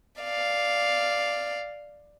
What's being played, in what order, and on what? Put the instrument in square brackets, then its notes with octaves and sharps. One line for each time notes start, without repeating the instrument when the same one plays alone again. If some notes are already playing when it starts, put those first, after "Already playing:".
[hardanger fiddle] D5 F5